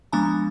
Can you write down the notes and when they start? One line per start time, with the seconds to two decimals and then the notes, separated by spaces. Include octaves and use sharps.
0.13 F3 G#3 B3 D4 G#5 A#5